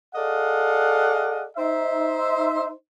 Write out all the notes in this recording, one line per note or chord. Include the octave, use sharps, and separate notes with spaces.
G#4 A4 D5 D#5 F5 F#5
D#4 C5 E5